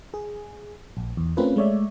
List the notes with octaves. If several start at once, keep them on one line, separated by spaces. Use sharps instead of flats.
G#4
A#1
E2
A3 C4 C#4 F4 A#4 B4
G#3 A3 C#5 D5 E5